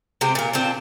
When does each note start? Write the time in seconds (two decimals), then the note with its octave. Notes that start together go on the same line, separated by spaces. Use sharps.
0.21 C3 G#3 C4 G4
0.35 A#2 A#4
0.53 C4 D4 F4